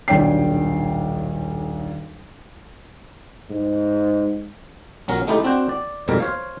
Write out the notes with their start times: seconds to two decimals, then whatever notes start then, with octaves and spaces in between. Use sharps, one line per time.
0.08 D#1 B1 D4 C#5 G5 C7
3.50 G#2
5.08 A#1 F#3 C#4 A#4
5.27 G#3 A3 D#4 E4 G4 A4
5.44 C4 D4 F#4 G5
5.69 D5
6.08 F2 G#2 B2 G3 A4 A#4
6.20 C5 C#5 F5